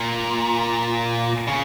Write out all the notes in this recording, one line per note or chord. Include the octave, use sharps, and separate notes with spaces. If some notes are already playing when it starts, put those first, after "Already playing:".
Already playing: A#2
C#3